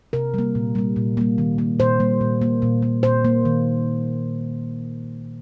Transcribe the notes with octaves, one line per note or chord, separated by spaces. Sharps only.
C3 A#4
G3 A#3
A#2
G3 A#3
A#2
G3 A#3
D#3
A#3
A#2 C5
G3 A#3
A#2
A#3
A#2
A#3
A#2 C5
A#3
D#3